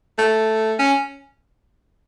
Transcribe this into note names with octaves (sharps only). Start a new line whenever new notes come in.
A3
C#4